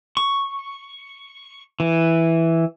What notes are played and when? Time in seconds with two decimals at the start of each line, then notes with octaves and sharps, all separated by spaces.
0.17 C#6
1.80 E3